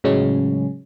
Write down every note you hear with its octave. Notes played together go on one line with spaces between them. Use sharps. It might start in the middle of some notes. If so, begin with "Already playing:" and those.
A2 C#3 F#3 G#3 C#4